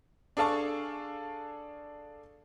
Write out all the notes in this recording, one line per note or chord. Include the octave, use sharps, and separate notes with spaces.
D4 G#4 A4 F5 A5 C#6